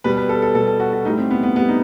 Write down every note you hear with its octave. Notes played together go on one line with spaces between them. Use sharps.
B2 G3 B4
B4
A4
A4
B2 G3 A4
A4
F#4
F#4
A2 G3 D#4
C4
B3
B3
A2 G3 B3
D#4